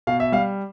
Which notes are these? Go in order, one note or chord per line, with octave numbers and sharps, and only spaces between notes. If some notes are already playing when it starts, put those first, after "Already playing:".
B2 F5
E5
G3 F5